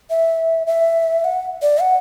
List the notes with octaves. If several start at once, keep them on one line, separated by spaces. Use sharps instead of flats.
E5
E5
F#5
D5
F#5